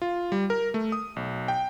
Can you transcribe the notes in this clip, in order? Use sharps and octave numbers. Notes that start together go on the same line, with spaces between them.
F4
G3
A#4
A3
D#6
B1
G5